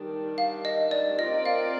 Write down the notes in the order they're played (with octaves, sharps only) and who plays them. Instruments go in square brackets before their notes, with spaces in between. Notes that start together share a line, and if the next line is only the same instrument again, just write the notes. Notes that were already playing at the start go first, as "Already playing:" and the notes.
Already playing: [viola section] D#3 G3 D4
[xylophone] F5
D#5
D5
[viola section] C4 F4 A#4 D5 [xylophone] D#5
[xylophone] F5